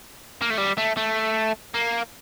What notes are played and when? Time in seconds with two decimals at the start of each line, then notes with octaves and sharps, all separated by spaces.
0.41 A#3
0.50 A3
0.58 G3
0.78 A3
0.97 A3
1.74 A#3